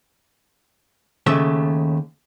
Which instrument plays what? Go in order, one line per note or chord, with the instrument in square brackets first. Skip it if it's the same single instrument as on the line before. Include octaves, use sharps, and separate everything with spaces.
[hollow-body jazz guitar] D#2 C#3 A3 E5